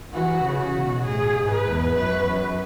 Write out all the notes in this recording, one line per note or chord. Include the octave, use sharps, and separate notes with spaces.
E3 F#4
C#3
F#4
B2
A2 G#4
G#2
B4
E2
F#2 B4